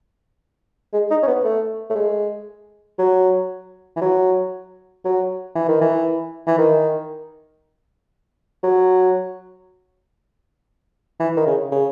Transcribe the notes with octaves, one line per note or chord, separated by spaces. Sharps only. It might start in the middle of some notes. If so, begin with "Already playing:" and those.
G#3
D#4
C#4
B3
A3
A3
G#3
F#3
E3
F#3
F#3
E3
D#3
E3
E3
D#3
F#3
E3
D#3
C#3
C#3